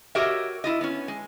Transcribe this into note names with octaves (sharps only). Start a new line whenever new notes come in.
F#4 G4 A#4 C#5 D#5 E5
E4 F4 D#5
B3 C#4
G#3